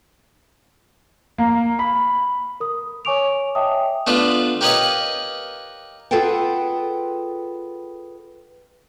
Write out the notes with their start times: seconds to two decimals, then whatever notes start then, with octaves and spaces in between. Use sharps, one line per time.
1.38 A#3
1.79 B5
2.60 A#4 D#6
3.05 C#5 G#5 C#6 D6 D7 F7
3.55 C#5 D#5 E5 G5 A5 D#6
4.07 A3 B3 D4 F4
4.61 G4 A#4 B4 C#5 D#5 F5
6.11 F4 G#4 A4 B4 F#5 G5